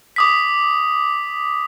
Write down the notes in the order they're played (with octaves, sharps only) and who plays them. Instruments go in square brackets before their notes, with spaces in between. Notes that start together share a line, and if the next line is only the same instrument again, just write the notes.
[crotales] D6 D#6 B6